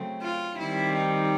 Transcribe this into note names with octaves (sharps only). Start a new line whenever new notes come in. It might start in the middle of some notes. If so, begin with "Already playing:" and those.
Already playing: C#3 F#3 A3 C4
F4
D#3 G3 C4 E4
D#4